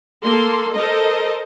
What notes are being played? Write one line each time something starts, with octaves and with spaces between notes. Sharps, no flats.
A#3 A4 C6
A4 A#4 C5 D#5